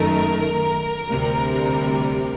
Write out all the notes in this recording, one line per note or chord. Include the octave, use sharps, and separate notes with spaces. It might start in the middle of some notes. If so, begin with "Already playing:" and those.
Already playing: F#2 D#3 A3 A#4
D2 C3 G3